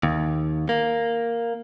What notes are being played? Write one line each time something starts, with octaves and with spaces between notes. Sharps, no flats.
D#2
A#3